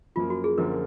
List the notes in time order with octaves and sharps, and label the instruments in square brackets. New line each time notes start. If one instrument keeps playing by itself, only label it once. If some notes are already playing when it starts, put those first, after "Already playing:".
[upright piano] F#2 F3 A#3 [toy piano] F4
[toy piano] F#4
G#4
[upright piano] F#2 D3 F3 A#3 F4 [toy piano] A#4